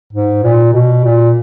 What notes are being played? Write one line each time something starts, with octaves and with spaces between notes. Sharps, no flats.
G#2
A#2
B2
A#2